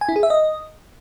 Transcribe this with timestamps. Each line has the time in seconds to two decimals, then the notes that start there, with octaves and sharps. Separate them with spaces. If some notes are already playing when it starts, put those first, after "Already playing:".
0.01 G#5
0.09 E4
0.16 G#4
0.23 E5
0.30 D#5